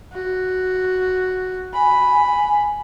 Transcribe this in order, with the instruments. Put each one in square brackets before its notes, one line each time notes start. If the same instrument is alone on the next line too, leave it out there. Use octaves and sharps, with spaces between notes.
[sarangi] F#4
[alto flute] G#5 [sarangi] B5